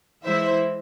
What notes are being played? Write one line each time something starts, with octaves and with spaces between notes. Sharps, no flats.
E3 G#3 E4 C5 E5